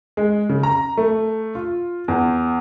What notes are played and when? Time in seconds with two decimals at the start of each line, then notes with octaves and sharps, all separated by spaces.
0.17 G#3
0.49 C#3
0.63 A#5
0.97 A3
1.55 F4
2.08 E2